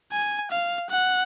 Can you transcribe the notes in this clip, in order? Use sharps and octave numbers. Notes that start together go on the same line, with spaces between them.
G#5
F5
F#5